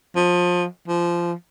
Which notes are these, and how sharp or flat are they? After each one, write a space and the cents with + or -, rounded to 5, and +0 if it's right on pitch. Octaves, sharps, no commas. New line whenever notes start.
F3 +25
F3 -15